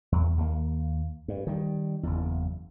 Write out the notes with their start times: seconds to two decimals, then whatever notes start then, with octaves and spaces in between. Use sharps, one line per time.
0.12 E2
0.38 D#2 A#3
1.28 G2
1.47 D#3 G3
2.03 F#1 E2